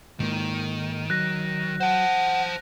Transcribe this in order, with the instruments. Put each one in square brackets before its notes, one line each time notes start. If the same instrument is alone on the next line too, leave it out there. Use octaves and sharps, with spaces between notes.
[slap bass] G#2 A#3 [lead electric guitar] D#3
[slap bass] F#3 [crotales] F#6 A#6
[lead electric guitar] C5 A5 [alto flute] F#5